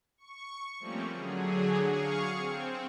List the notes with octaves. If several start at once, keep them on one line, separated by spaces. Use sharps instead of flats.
C#6
F3 G3 A3 A#3 C4 C#4
D3 F#3 G#4
G#4 F5 C#6
C4